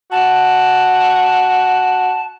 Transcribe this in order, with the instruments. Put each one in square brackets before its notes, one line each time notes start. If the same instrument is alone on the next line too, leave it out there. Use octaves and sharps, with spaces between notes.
[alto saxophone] F#4 [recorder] A5